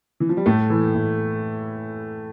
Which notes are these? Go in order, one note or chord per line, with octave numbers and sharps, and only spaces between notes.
E3
F3
G3
A2 A3
E3
A2